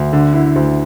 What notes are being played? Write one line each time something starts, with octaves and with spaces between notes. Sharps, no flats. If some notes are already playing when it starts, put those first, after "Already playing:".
Already playing: D2
D3
E4
D2